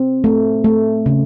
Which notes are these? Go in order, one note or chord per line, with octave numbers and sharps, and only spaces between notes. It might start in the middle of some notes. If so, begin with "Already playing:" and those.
Already playing: C4
A3
A3
C#3